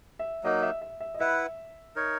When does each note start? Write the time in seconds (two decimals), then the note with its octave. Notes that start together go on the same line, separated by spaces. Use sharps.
0.19 E5
0.44 F#3 A#3 D#4 D#5
0.63 E5
0.82 E5
1.00 E5
1.14 D#5
1.19 E4 B4 E5 F#5
1.96 D#4 A#4 C#5